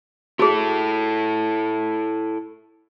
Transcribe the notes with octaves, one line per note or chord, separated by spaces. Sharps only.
E4 F#4 G#4 A4